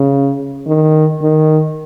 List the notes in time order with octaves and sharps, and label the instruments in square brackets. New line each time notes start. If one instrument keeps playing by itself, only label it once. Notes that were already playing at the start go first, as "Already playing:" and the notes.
Already playing: [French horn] C#3
D#3
D#3